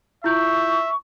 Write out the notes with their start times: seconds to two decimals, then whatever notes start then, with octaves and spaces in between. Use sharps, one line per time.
0.24 E4 F4 E5 C#6 G6